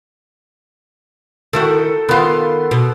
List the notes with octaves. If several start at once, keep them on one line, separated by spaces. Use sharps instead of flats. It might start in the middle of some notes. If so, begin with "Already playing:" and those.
D#3 E4 F#4 A4 G5
D#3 B3 F4 C6
B2